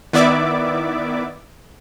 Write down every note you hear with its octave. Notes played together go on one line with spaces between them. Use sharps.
D#3 B3 E4 D5 E5 D6